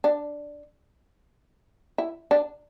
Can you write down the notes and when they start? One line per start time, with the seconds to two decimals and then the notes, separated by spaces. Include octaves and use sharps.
0.04 D4
1.98 E4
2.31 D4